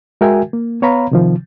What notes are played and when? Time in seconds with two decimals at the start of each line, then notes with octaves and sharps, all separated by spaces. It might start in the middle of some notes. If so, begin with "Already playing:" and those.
0.21 G#3 F#4 A#4 E5 G5 G#5
0.53 A#3
0.82 B3 C#5 F5 A#5 B5
1.12 C3 D#3 F3